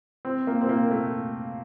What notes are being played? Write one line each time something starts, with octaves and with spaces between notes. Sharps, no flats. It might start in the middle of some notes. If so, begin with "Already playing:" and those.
C4
A#3
C4
A#3
A3